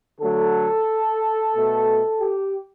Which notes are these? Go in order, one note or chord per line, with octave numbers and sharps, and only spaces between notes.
D3 F#3 A3 A4
B2 A3
G4